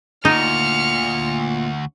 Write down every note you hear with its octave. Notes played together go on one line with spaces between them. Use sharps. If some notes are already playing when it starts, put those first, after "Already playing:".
D2 A#2 D#4 F6 C#7